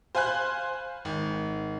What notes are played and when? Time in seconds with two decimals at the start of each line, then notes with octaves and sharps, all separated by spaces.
0.15 C5 F5 G#5 B5 F#6
1.05 G#1